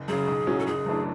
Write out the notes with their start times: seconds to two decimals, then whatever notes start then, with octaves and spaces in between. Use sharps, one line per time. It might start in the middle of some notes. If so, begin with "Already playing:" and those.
Already playing: F#1
0.08 F#2 C#3 G#4
0.28 B1
0.47 A2 F#3 C#4
0.59 A4
0.66 F#1 G#4
0.86 F#2 E3 A3 D4